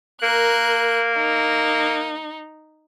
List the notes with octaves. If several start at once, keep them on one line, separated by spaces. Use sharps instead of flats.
A#3 A#4 F#6
D#4